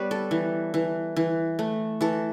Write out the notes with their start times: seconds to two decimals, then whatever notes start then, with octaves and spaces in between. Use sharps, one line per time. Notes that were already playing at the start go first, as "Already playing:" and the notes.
Already playing: G3 B3 B4 C#5
0.11 A4
0.31 E3
0.74 E3
1.16 E3
1.59 A3
2.01 E3 A4